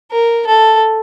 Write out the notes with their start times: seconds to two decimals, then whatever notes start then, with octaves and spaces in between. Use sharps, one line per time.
0.11 A#4
0.47 A4